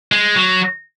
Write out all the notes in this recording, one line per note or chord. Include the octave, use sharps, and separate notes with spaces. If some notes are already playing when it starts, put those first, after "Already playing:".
G#3
F#3